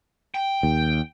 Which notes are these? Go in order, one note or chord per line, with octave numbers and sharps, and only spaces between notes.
G5
D#2